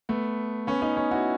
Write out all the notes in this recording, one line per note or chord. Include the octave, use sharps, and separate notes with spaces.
A3 B3
B3 C#4
C#4 D#4
C#4 D#4
E4 F#4